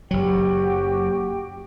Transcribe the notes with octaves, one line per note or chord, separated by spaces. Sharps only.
F#1 F#3 F#4 G4 G5